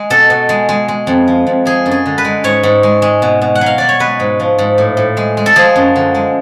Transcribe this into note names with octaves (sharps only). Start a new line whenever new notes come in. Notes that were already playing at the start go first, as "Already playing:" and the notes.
Already playing: G#3
B2 A4
B2
G#3
G#3
G#3
F2
F3
F2
F3 G#4
F#2
G#4
D3
B4
G#3
G#2 C#5
G#2
G#3
G#3
B2
B2
F#5
F#3
F5
F#3 D5
C#5
G#3 B4
G#2
F3
G#2
A2
A2
G#3
G#3
A4
F3 G#4
F#2
D3
G#3